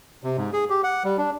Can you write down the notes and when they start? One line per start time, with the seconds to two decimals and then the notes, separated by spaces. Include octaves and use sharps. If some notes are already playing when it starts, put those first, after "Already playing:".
0.24 C3
0.37 G#2
0.53 G#4
0.70 G4
0.84 F#5
1.04 G3
1.18 D4